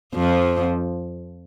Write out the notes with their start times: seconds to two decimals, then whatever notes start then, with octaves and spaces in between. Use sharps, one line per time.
0.15 F2 F3